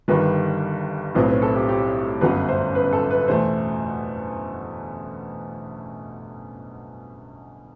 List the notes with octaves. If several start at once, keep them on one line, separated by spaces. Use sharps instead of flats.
G1 G2 D#3 G3 B4
B1 A2 F#3 C4 B4
B4
A4
G4
G4
G1 F#2 F#3 B3 B4
C5
B4
A4
B4
E2 B2 A3 C5